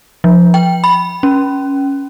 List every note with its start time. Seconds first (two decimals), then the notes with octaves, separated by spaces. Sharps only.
0.24 F3
0.54 G5
0.84 B5
1.23 C#4